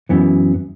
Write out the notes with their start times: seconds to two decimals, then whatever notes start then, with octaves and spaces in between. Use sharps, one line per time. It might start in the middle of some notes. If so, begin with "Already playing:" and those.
0.09 F#2 E3 B3